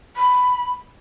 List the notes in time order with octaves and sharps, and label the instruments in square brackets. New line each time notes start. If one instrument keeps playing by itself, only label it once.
[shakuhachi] B5